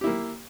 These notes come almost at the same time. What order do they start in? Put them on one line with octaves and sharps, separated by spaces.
G4 E4 A#3